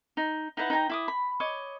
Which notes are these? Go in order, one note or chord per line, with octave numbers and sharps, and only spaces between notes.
D#4
D#4 E4 B4 F#5
D#4 G5 G#5 A#5
E4 D6 D#6
B5
C#5 D#5 D6